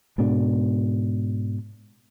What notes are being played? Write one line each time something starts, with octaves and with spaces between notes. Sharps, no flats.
G#2 B2 D4